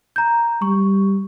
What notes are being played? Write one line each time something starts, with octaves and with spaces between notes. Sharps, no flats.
A#5 G6
G3 C#6